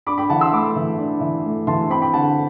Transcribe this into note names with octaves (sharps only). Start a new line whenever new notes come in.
D4 B5 D6
G5 B5
E3 F#5 A5
C6 E6
A3 B5 D6
E3
D4
E3
A3
E3 A5 C6
C4 G5 B5
G5 B5
D3 F#5 A5